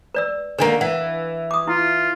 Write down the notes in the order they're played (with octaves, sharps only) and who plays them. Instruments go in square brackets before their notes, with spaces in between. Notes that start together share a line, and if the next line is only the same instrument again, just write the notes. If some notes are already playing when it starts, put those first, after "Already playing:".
[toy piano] B4 D5 E6
[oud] D3 D#3 A#3 [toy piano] D4 B4
[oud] E3 [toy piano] F#5
[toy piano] D6 D#6
[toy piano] E4 [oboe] F4